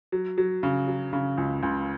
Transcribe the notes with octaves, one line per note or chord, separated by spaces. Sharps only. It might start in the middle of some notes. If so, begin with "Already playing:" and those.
F#3
F#3
C#3
F#3
C#3
C#2
C#2